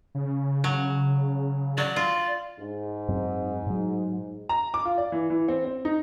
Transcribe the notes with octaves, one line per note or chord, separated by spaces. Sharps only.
C#3
F#3
F#3 D5
F4
G#2
F#2 C4
A2 F#3
A#5
D6
F4
D5
E3
E3
C4
C4
D#4